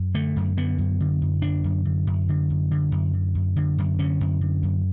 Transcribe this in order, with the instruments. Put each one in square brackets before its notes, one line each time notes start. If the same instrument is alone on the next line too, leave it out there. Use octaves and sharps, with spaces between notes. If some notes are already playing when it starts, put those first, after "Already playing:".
Already playing: [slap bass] F#2
D3 A3
F#2
D3 B3
F#2
D3
F#2
D3 D4
F#2
D3
F#2
D3
F#2
D3
F#2
D3
F#2
D3
F#2
D3 C#4
F#2
D3
F#2